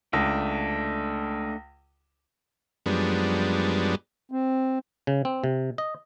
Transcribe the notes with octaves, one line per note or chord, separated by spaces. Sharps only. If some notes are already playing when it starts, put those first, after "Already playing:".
C#2 A3 D4
F#2 F3 G3 G#3 B3 D4
C4
C#3
C4
C3
D#5